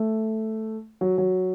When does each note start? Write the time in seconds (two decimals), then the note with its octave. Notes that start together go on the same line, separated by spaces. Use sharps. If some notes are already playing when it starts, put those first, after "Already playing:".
Already playing: A3
1.01 F#3
1.18 F#3